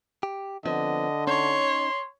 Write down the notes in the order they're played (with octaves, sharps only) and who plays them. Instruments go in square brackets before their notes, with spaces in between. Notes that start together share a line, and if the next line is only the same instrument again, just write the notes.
[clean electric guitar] G4
[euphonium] D3 [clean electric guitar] F3 B3 C4 [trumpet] D#5
[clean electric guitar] C#4 D#4 [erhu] C#5 [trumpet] C6